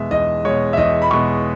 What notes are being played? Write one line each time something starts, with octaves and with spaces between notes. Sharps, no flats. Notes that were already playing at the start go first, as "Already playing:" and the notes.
Already playing: E2 B2 G#3 E5
E2 D#5
B2 G#3 C#5
E5
E2 D#5
B5
B2 G#3 C#6